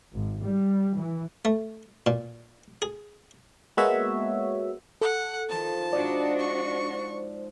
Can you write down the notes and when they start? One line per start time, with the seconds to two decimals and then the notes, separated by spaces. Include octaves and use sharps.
0.13 G#1
0.41 G3
0.96 E3
1.45 A3
2.07 A#2
2.82 G#4
3.77 G#3 A#3 B3 F#4 C#5 E5
5.01 A4 F#5
5.49 D#3 F3 A5
5.93 G#2 D4 F#4 D5
6.39 C#6